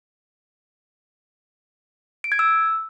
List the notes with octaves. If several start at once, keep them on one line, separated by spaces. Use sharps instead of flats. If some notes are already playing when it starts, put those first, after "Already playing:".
D7
G#6
E6